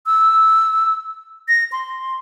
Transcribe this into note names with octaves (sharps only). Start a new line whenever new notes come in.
E6
A#6
C6